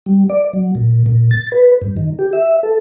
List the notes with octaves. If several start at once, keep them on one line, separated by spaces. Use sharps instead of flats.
G3
D5
F#3
A#2
A#2
A6
B4
G2
D#3
G4
E5
A4